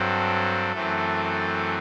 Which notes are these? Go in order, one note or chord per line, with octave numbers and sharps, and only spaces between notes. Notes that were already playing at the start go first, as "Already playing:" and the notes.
Already playing: G2 F#3 C4 A4
F#2 E3 A3 C4